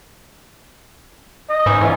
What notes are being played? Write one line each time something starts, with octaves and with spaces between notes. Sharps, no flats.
D#5
G#2 E3 C#4 D#4
E3 C#4 F4